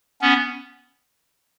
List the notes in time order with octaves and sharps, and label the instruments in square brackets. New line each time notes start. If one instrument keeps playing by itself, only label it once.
[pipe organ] B3 C#4